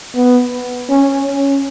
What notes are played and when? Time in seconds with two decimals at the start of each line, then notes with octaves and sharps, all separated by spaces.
0.15 B3
0.89 C#4
1.26 C#4